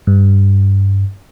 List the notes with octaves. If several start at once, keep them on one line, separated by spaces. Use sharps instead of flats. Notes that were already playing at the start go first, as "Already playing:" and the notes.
G2